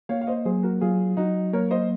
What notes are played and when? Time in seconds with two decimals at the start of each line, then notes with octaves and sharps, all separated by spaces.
0.09 A#3 C#5 F5
0.21 F5
0.27 C5 D#5
0.45 F#3 G#4 C5
0.63 F#4 A#4
0.81 F#3 F4 G#4
1.17 F#3 D#4 F#4
1.53 A#3 A#4 C#5
1.71 C5 D#5